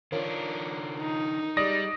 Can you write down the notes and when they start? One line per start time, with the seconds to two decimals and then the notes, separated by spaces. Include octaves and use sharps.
0.12 D#3 F3 D4 A#4 C#5
0.99 D#4
1.57 G3 G#3 D5 D#6 A#6